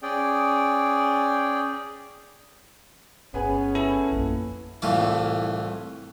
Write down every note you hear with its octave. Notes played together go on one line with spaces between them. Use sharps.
C#4 G#4 D5 G5
G1 B3 C#4 G#4 B4
E4 A4
A#1 F#2 A#3
C2 A2 E3 F4 D6